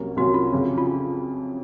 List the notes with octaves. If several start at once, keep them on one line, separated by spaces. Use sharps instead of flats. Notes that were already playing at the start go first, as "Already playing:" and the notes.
Already playing: C2 C3 F#3 A#3 C#4
C2 C3 F#3 A#3 C#4 F#4
F4
F2 C#3 F#3 C#4
F4